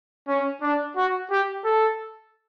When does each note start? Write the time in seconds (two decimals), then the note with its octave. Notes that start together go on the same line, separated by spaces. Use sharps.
0.28 C#4
0.62 D4
0.97 F#4
1.31 G4
1.65 A4